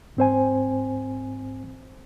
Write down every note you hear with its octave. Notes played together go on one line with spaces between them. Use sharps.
G#2 C4 C5 G#5